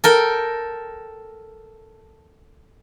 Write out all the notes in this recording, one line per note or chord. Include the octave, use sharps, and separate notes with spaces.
A4 A#4 G5